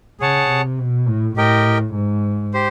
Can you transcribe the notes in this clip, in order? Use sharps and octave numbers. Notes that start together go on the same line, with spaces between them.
C#3 G#4 C#5 F#5 A5
C3
B2
A2
A2 G4 A#4 D#5 G5
G#2
G4 C5